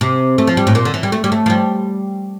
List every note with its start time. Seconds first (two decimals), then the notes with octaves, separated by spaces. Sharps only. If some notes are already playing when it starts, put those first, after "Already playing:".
0.01 C3
0.38 A3
0.47 F3
0.57 G3
0.67 A2
0.75 A#2
0.85 D3
0.94 E3
1.03 G3
1.12 A3
1.24 G3
1.32 A3
1.46 F3
1.50 G3